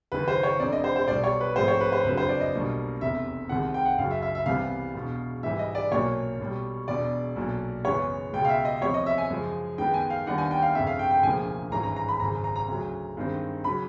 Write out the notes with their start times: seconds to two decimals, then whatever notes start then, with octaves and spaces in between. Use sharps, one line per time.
0.12 F#1 F#2 D#3 B4
0.28 C5
0.43 C#5
0.60 F1 F2 D3 D5
0.72 D#5
0.84 C5
0.96 C5
1.08 B1 B2 G3 D5
1.24 C#5
1.41 B4
1.56 G#2 F3 A3 C4 C5
1.68 C#5
1.81 B4
1.92 C5
2.04 F#1 F2 D3 F#3 B4
2.17 C5
2.29 D5
2.41 D#5
2.54 B1 B2 G3 A#3 D4
3.01 F1 E2 C3 E5
3.49 C2 C3 D#3 G#3 F#5
3.74 G5
3.85 F#5
3.98 F#1 F#2 C#3 F#3 F5
4.11 E5
4.22 E5
4.35 E5
4.46 C2 C3 E3 G3 B3 F5
4.94 E1 E2 B2
5.43 G#2 E3 G3 E5
5.59 D#5
5.75 D5
5.91 B1 A#2 F#3 A#3 C#4 C#5
6.39 B1 B2 G3
6.88 E1 E2 B2 D5
7.36 B1 A#2 F#3
7.84 F#2 C#3 E3 G#3 B3 C#5
8.33 C#2 B2 G#3 G5
8.45 F5
8.49 E5
8.65 D#5
8.81 E2 C3 F3 C#5
8.94 D#5
9.06 E5
9.18 G#5
9.30 F#2 C#3 F3 G#3
9.78 F#2 D#3 G#3 B3 G5
9.94 G#5
10.10 F5
10.27 D#2 D#3 G3 B3 D4 F#5
10.38 G#5
10.51 G5
10.62 F5
10.75 G1 F2 C#3 E5
10.87 F5
10.99 G5
11.11 G5
11.23 E1 D2 C#3 F3 A#3 G#5
11.71 G#1 G2 E3 G#3 C#4 A#5
11.83 A#5
11.96 A#5
12.08 B5
12.19 G#1 F#2 C#3 A#5
12.44 A#5
12.56 A#5
12.68 D2 C#3 F#3
13.17 G2 D#3 G#3 C4
13.64 C#3 F#3 B5